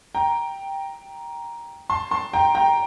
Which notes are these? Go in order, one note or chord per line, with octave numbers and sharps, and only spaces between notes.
G5 A#5
A5 C6
A5 C6
G5 A#5
G5 A#5